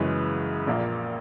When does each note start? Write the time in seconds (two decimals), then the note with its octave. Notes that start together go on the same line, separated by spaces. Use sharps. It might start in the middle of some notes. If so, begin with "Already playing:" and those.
Already playing: F#2 C#3 E3 G#3 C#4 B4
0.67 A#1 A#2 A#3